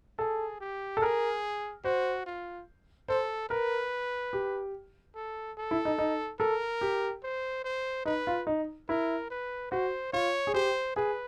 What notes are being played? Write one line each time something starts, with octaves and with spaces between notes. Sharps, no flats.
G#4 A4
G4
A4
G#4 A#4
F#4 C5
F4
A4 C5
A#4 B4
G4
A4
A4
E4
D#4
D#4
A4 A#4
G4
C5
C5
D#4 B4
F4
D#4
E4 A#4
B4
F#4 C5
F4 C#5
G#4
G4 C5
G#4 B4